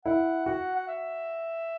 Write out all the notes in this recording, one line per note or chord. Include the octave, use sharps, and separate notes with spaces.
E4 F#5
F#4 F#5
F#5
E5